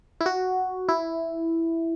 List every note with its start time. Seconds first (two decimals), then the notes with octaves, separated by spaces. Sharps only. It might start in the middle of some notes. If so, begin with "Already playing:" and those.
0.21 E4
0.26 F#4
0.89 E4